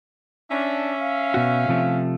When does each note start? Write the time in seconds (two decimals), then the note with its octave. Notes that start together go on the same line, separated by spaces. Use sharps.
0.50 C#4 D4 E5
1.00 F5
1.34 B2 F#4
1.69 C3 F3 A3